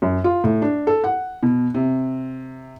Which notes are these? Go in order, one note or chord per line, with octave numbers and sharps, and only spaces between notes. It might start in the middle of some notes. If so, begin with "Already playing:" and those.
F#2
F4
A2
D4
A4
F#5
B2
C3